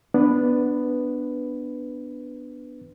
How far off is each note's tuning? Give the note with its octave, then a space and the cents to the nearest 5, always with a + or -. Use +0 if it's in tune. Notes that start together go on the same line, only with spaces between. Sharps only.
B3 +0 D4 +0 B4 +5